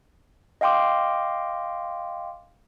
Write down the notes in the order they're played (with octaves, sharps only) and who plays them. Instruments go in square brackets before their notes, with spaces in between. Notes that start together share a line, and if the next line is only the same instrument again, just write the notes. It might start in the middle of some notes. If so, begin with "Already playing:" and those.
[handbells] D#5 F5 G5 C6 D6